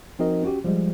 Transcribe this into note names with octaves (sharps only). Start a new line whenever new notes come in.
F3 C4 D#4 F#4 A#4 D#5
C#4 F#4 G4
F3 G3 G#3